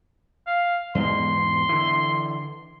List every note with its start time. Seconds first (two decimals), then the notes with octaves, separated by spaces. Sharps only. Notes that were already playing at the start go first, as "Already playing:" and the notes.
0.46 F5
0.95 E2 G#2 B2 C6
1.69 D3 E3